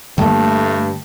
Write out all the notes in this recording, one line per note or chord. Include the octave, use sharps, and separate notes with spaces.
G2 D3 G3 A3 A#3 G5 A5